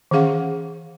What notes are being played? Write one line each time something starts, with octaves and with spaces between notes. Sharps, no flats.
D#3 E3 C#4 G#4 F5 F#5